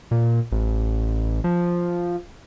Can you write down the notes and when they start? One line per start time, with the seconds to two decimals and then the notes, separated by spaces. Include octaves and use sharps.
0.11 A#2
0.52 A1
1.44 F3